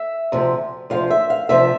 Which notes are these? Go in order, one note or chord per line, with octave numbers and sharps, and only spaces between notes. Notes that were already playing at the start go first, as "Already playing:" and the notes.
Already playing: E5
D2 C3 F3
D2 C3 F3 F5
E5
F5
D2 C3 F3 E5